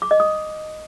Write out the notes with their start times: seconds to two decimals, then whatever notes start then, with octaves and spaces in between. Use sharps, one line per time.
0.02 D6
0.11 D#5
0.20 D#6